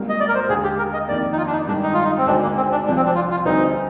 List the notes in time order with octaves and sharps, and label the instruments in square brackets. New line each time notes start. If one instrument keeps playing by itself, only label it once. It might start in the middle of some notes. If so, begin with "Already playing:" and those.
Already playing: [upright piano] G#1 G#2 G3 A#3
[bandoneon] D#5
D5
A#4
C5
[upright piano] D#2 D3 G#3 [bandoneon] G#4
[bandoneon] G4
A#4
D#5
[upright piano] F2 D#3 A#3 [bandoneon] D5
[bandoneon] D#4
F4
D4
D#4
[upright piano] G2 D#3 G#3 [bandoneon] D4
[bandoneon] D#4
F4
D#4
C4
[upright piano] D2 D3 G#3 D#4 [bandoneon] D4
[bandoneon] A#3
C4
D4
[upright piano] C2 C3 F3 [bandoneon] D4
[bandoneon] C4
D4
F4
F4
[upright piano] D2 D3 G3 C4 [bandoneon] D#4